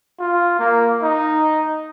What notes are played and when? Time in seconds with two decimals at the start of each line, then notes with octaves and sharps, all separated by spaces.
0.19 F4
0.59 A#3
1.02 D#4